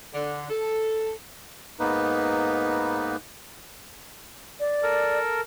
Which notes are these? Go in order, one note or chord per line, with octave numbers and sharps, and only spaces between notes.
D3
A4
G#2 A#3 B3 D#4 B4
D5
A4 A#4